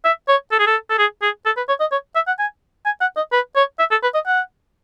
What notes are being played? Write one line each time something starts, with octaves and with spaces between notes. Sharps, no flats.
E5
C#5
A4
G#4
A4
A4
G#4
G#4
A4
B4
C#5
D#5
C#5
E5
F#5
G#5
G#5
F#5
D#5
B4
C#5
E5
A4
B4
D#5
F#5